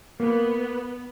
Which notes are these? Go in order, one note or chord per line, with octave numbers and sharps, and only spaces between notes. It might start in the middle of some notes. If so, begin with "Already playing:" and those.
A#3 B3